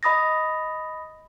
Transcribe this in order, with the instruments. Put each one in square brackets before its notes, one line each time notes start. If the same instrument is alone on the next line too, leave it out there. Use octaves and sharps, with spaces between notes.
[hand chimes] D#5 B5 D#6 A6 A#6